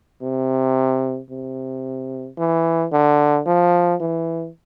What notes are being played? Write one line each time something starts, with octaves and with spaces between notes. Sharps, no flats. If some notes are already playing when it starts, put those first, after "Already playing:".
C3
C3
E3
D3
F3
E3